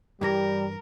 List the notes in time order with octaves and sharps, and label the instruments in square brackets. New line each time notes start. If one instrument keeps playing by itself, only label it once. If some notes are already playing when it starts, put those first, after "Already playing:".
[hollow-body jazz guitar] G2 E3 A#5 [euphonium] G3 [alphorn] G4 [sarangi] A#4